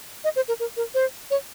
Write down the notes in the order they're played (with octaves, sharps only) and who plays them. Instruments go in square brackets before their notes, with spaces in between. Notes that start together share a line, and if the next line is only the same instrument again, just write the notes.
[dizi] D#5
C5
A#4
A#4
A#4
C5
C#5